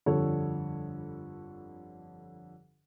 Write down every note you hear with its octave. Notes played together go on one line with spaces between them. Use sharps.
G1 F2 D3 G3 A4 C#5